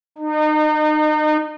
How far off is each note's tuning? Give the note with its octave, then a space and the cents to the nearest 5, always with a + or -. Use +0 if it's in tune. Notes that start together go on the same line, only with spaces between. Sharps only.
D#4 -35